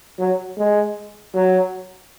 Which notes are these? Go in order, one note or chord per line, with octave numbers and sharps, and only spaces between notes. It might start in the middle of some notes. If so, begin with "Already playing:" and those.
F#3
G#3
F#3